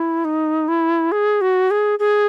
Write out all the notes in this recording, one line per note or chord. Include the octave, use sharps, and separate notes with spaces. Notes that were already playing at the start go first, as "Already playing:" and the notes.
Already playing: E4
D#4
E4
G#4
F#4
G#4
G#4